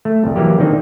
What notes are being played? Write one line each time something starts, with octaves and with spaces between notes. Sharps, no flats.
A3
C2 F2
E3 F#3 A#3 G4
D#3 A#3 C4 D4 D#4